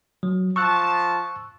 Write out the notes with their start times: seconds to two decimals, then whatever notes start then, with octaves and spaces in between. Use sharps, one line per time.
0.23 F#3
0.56 F3 A5 C#6 E6 F#6